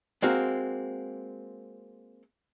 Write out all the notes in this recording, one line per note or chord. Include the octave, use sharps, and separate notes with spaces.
G#3 A#3 C4 F#4 F5